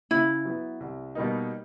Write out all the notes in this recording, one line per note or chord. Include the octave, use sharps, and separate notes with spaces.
C#3 E4
F#3 B3
C2
B2 G3 A#3 D#4